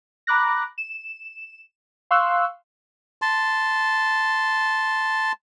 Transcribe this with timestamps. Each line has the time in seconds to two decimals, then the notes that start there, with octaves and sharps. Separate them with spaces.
0.27 A#5 B5 D6 F#6 A#6
0.78 E7
2.11 F5 C6 C#6 E6 F#6
3.22 A5 C6